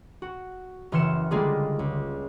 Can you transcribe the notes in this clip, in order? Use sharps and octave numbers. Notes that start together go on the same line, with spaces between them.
F#4
F#1 E3 C6 F6 C#7 E7
D3 G3 G#3 A#3 F4 G#4
C#2